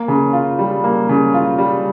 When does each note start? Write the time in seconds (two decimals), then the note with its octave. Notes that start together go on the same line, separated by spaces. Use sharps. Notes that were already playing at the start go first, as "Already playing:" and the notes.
Already playing: A#3
0.08 C#3
0.33 F4
0.59 G3
0.84 A#3
1.09 C#3
1.34 F4
1.58 G3